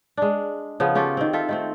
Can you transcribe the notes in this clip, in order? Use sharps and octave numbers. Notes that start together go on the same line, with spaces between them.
G#3 D4
C#3 F3 B3
C#4 F4 G4 A4
D#3 C4
F4 A4 E5
D#3 A3 C4